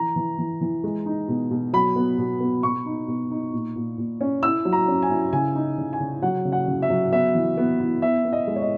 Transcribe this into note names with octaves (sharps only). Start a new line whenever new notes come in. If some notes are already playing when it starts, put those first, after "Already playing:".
Already playing: E3 A#5
E3
E3
E3
G#3
D#4
B2
B2
F#3 B5
B3
B2
B3
B2 C#6
D#4
B2
D#4
A#2
A#2
A#2
C#4
E4 E6
F#3
A#5
C#4
G#5
E4
C#3 G#5
D#4
C#3
G#5
C#3
F#3 F#5
C#3
F#5
C#3
E5
F#3
B3 E5
E3
B3
E4
B3 E5
B3
D#5
G#3
C#5
D#5